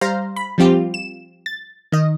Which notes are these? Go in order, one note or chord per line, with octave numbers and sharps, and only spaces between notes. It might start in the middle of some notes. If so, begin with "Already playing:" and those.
G3 C5 F5 A#5
B5
F3 G3 C4 F4 G4
E7
A6
D#3 D#5